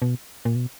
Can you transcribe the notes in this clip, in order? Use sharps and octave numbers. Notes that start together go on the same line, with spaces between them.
B2
A#2
B2